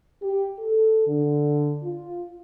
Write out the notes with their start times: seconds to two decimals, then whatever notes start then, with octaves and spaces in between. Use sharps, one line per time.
0.21 G4
0.58 A4
1.07 D3
1.83 F4